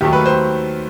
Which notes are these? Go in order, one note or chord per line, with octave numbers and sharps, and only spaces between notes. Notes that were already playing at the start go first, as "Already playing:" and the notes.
D#2 D#3 F#3 A3 G4
B4
C5